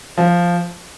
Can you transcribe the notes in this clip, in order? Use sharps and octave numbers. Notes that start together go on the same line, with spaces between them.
F3